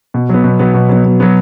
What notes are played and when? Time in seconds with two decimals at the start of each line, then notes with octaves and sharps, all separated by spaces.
0.14 B2
0.29 F#3 B3
0.44 B2
0.59 F#3 B3
0.74 B2
0.89 F#3 B3
1.05 B2
1.20 F#3 B3